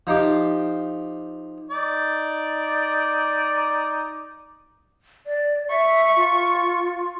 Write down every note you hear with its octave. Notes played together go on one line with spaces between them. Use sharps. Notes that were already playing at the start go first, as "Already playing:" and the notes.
F3 D#4 G4 F5
D#4 D5
D5
E5 C#6
F4